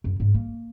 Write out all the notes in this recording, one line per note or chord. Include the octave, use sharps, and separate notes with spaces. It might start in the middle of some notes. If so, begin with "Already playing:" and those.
F#2
G#2
A#3